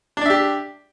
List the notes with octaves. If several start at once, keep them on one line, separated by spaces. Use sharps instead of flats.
D4 G4 D5 E5